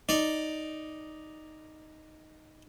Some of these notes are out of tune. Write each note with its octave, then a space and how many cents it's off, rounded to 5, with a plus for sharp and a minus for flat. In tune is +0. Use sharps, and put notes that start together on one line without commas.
D#4 +0 D5 +0